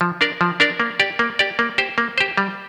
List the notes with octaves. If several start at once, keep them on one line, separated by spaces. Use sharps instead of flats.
F3
D4 A#4 D5
F3
D4 A#4 D5
A#3
G4 D5
A#3
G4 D5
A#3
G4 C5
A#3
G4 C5
G3